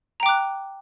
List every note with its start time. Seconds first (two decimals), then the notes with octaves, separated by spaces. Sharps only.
0.20 A#5
0.23 G5
0.26 D6
0.29 F#6